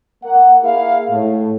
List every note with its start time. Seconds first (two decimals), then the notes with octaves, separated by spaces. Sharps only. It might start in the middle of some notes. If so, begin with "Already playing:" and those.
0.24 A#3 F#5
0.62 A#3 E4 G#4 F5
1.10 A2